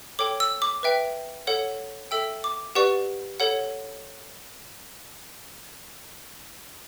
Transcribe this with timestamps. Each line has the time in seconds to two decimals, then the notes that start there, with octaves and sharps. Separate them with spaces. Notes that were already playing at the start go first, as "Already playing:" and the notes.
0.19 A4 C#5 G5 D6
0.40 E6
0.62 D6
0.83 B4 E5 G5
1.47 A4 C#5 F#5
2.11 A4 E5 G5 E6
2.44 D6
2.75 G4 B4 D5 F#5 C#6
3.40 A4 C#5 F#5